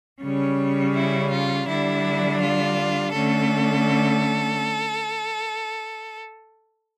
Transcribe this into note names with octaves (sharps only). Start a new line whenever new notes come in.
C#3 G3 C#4
E4
F4
D3 G3 D4 E4
F4
D3 A3 C#4 A4